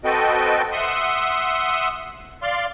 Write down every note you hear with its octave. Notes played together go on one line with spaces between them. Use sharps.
C4 F#4 A4 B4 D#5 G5
E5 F#5 C6 D#6 E6
D5 F5 C6